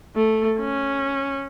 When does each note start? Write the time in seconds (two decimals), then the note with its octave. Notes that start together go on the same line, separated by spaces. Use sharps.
0.16 A3
0.59 C#4